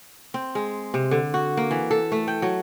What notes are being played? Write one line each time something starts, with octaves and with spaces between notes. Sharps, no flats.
C4
G#3
C3
D3
F#4
A#3
E3
A4
A3
G5
F#3